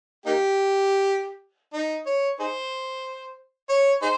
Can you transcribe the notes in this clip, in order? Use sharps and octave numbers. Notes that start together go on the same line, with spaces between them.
A#3 D#4 G4
D#4
C#5
D#4 G#4 C5
C#5
D#4 G#4 C5